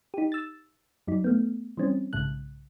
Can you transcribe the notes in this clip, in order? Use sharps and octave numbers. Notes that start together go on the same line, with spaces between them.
D#4 G4
E6 A6
F#2 F#3 D#4
A3 B3
E3 G3 C4 C#4
B1 G#2 C#3 F#6